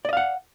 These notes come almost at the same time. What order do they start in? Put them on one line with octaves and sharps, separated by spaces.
D5 D#5 F5 F#5